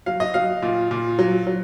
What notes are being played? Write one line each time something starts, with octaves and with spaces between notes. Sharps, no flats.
F#3 F5
D#5
F#3 F5
A#2
A#2
F#3
F#3